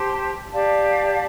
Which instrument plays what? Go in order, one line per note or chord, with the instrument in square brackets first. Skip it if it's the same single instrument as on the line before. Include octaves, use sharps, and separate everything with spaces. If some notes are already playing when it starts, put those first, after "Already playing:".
Already playing: [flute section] G4 C5 A5 C6
G4 D5 F5 A5